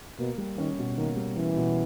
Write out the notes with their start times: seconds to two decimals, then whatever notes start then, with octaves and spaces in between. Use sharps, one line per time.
0.19 B2 A#3
0.38 G3
0.58 D#3 C#4
0.78 B2
0.97 D#3 A#3
1.17 G3
1.37 E3 C#4
1.56 B2